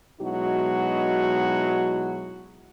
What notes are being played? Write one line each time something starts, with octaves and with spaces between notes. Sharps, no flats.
B2 F#3 G#3 D#4 E4 F#4